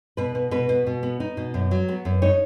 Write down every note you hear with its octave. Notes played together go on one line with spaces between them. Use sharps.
B2 B4
B2
B2 B4
B2
B2
B3
D#4
B2
F#2
F#3
B3
F#2
D#4 C#5